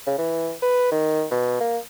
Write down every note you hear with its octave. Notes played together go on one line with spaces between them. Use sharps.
C#3
E3
B4
D#3
B2
A#3